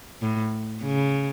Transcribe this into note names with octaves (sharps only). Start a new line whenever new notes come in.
A2
C#3